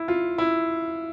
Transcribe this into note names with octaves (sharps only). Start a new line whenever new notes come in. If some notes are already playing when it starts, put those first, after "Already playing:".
Already playing: E4
F4
E4